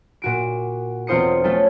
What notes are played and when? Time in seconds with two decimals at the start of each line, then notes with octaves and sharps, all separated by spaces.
0.22 A#2 F#4 D7
1.07 E1 C4 F4 C5 D#6 C#7
1.44 A3 C#4 F4 A4